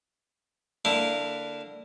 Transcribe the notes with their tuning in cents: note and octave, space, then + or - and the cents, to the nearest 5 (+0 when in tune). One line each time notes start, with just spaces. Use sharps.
D3 +0 A#3 -20 E4 +5